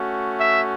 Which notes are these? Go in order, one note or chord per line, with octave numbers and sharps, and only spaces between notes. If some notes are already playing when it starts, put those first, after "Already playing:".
Already playing: A3 C#4 F#4
E5